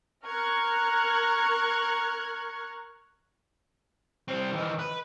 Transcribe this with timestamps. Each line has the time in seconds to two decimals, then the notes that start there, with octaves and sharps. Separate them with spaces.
0.26 A#4 A#5 C#6 F6 F#6 G#6
4.28 G3 C4
4.53 D#3 E3
4.79 B4